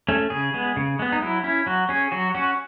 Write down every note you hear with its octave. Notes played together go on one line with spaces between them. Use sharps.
A3 C#4
C#3 G#4
G#3 B3
C#3
G#3 B3
D#4
F#3 E4
C#4 E4
F#3 F#4
C#4 G#4
F#3 F#4
C#4 F#4